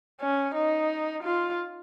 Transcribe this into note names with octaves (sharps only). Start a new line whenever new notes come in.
C#4
D#4
F4